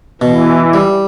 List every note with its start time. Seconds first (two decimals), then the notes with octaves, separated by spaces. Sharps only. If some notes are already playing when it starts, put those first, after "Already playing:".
0.21 B2 E3
0.74 G3